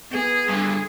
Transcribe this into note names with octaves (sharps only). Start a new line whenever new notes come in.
B3 G#4
G2 D3